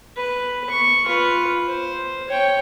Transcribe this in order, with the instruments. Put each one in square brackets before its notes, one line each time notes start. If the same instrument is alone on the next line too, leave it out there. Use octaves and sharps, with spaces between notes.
[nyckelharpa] B4
C#6
F4 B4
C5
C#5 G5